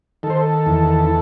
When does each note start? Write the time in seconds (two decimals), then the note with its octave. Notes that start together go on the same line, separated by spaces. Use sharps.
0.23 D#3 A4
0.30 C5
0.37 A4
0.66 E2